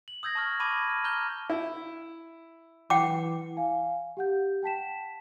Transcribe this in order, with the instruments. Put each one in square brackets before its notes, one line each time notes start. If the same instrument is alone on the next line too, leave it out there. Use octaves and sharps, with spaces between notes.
[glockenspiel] F#7
D#6 E6 G6 G#6 A#6
A5 C#6 F6
A5 B5 C#6 D6 G#6 D#7
F6
A#5 F6 G6 G7
[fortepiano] E4
[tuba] E3 [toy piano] F#5 G5 D6
[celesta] F5 G#5
G4 F#5 G6
G5 A5 B6 E7